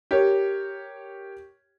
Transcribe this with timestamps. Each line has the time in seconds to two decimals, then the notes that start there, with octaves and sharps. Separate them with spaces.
0.11 G4 A#4 C#5